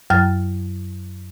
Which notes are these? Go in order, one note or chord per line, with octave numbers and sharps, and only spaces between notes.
F#2 F#3 F6 A6